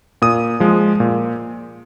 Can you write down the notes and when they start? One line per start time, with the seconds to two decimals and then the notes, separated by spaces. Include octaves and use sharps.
0.22 A#2 D#6
0.60 F3 G#3
1.00 A#2